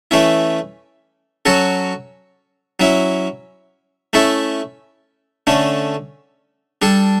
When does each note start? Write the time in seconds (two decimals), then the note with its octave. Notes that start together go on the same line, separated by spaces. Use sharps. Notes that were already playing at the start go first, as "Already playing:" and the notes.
0.11 E3 A3 C#4 E4
1.46 F#3 C#4 F#4 A4
2.80 F#3 C#4 E4
4.13 A3 C#4 E4 A4
5.47 D3 A3 C#4
6.82 G3 D4 A4